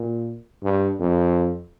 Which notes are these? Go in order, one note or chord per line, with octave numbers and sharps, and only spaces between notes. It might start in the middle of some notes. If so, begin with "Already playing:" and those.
Already playing: A#2
G2
F2